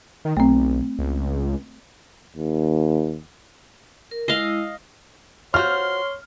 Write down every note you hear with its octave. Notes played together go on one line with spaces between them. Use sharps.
D#3
B1 A3 C4
C#2
D#2
A#4
G#3 E4 D#5 F5 E6
F4 F#4 C5 C#5 C6 F6